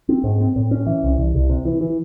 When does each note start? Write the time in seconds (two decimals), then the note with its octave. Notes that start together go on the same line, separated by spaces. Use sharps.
0.09 C4
0.24 G#2
0.40 C4
0.56 A2
0.71 C#4
0.86 E3
1.03 C2
1.18 C2
1.35 C2
1.49 C3
1.65 E3
1.81 E3